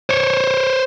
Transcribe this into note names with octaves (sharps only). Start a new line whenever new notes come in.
C5 C#5